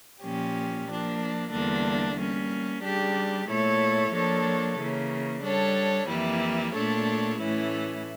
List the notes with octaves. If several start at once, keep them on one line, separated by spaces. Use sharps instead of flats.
A#2 F3 A#3 C#4 G4
F3 A#3 D4
E2 D3 G3 A#3 D4
G3 A#3 C#4
C#3 G3 D4 G4
A#2 A3 E4 A4 C#5
F3 A#3 D4 A4 C#5
C#3 E3 A#3
G3 D4 A4 C#5
F2 E3 G3 A#3 E4
A#2 A3 D4 A4 C#5
A2 E3 A3 C#4 E4